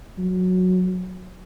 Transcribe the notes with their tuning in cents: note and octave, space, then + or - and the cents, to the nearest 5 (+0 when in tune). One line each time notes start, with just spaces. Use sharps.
F#3 -15